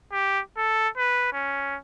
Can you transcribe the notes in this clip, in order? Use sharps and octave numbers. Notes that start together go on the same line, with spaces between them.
G4
A4
B4
C#4